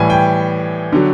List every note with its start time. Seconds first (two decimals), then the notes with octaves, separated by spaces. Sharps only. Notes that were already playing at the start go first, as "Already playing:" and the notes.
Already playing: A2 E3 G3 G#5
0.10 G5
0.93 D3 F#3